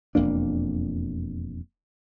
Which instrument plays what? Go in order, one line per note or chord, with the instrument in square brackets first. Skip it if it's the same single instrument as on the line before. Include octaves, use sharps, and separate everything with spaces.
[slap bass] E1 F2 A#3 D4